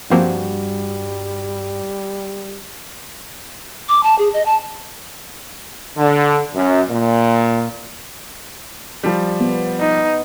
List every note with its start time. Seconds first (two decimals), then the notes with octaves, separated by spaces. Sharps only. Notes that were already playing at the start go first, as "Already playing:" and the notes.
0.11 G2 F3 G3 A#3 C4 F#4 C6
3.89 D6
4.03 A5
4.19 G#4
4.34 D#5
4.46 A5
5.97 D3
6.53 F#2
6.89 A#2
9.03 F3 G3
9.40 B3
9.80 D#4